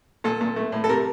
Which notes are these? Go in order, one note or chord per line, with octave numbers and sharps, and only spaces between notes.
A#2 A4
A#2
A3
A2
A4
C3 A#4